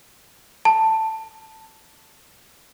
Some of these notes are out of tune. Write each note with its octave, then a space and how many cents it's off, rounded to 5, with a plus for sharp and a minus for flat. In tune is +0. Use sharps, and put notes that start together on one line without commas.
A5 +10